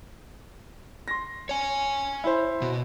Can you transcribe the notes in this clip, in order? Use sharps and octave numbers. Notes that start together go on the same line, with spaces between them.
C6 A#6
C#5 G#5
E4 C5
B2